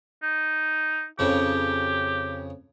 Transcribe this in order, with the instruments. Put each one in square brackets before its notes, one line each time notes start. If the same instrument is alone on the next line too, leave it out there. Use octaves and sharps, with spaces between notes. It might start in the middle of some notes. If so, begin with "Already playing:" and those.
[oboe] D#4
[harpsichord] F2 C#3 [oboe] G4